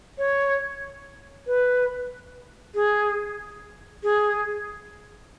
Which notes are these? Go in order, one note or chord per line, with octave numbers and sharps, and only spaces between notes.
C#5
B4
G#4
G#4